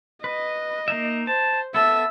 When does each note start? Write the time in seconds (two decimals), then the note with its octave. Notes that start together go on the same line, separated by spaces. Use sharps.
0.24 B4 D#5
0.88 A#3 D#4 E5
1.27 C5 A5
1.74 B3 A4 E5 E6